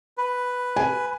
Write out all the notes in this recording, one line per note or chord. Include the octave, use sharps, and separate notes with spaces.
B4
G#5